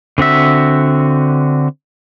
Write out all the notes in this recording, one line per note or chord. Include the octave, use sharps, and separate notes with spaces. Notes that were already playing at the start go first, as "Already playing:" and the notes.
D3 C4 F#4 E5